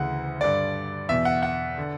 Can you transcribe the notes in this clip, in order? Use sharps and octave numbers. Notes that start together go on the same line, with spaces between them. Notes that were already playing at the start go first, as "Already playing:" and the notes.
Already playing: D2 C#3 E3 F#5
G2 D3 D5
E2 B2 E5
F#5
F#5
D3